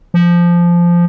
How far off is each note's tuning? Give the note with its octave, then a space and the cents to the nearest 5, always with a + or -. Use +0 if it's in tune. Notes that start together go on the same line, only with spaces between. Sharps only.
F3 -10